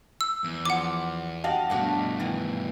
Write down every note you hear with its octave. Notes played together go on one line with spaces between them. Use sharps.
E6
E2
F3 F#5 D6
F#4 G4 D#5 F5 A5
G2 B2 A3 D4 F#4
D#3 E3